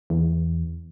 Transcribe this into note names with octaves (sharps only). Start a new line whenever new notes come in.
E2